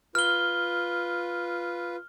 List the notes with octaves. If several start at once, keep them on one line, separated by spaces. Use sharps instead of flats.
F4 B4 F6 G7